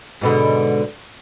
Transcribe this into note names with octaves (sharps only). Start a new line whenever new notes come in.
G#2 B2 D3